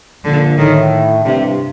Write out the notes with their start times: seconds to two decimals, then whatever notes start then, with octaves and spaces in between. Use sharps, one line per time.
0.24 A#1 A#2 D3
0.58 A2 D#3
1.25 G2 C3